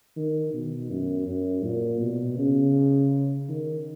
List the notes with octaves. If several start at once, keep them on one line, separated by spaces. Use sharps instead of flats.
D#3
B2
F#2
F#2
A#2
B2
C#3
D#3